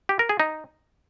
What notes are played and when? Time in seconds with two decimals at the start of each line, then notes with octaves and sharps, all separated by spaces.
0.09 G4
0.19 A#4
0.29 G#4
0.40 D#4